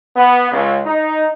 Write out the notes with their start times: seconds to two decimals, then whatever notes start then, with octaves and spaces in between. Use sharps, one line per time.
0.16 B3
0.52 C#2
0.86 D#4